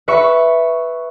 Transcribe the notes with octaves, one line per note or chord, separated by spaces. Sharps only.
B4 E5 B5 C#6